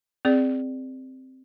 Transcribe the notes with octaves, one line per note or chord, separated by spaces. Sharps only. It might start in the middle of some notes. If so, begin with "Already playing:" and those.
C4 G#4 D5